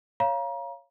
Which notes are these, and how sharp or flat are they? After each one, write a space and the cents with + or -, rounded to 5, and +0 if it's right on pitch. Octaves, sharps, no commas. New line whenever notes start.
C#5 +0 F5 -10 A#5 +35